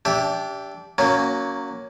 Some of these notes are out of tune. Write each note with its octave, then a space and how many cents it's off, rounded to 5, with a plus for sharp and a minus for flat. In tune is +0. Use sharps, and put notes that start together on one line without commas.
D4 -25 G4 +0 E5 +0
F#3 +0 A#3 +0 C#4 +20